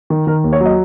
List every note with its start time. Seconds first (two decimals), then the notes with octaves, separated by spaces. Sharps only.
0.10 D#3
0.27 D#3 A#4
0.44 D#2
0.53 C#5
0.61 F#3
0.66 D#5